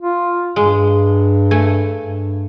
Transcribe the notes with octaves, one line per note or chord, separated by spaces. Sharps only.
F4
G2 G#3
A3 G#5
G2